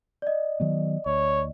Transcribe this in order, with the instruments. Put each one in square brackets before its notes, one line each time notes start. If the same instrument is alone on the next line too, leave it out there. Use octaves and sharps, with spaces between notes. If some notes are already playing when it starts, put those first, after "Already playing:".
[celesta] D5 D#5
[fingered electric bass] D#3 F#3 B3
[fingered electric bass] D2 [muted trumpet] C#5